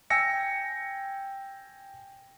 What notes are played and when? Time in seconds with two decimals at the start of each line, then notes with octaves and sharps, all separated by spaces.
0.10 G5 G#5 E6 A#6 C#7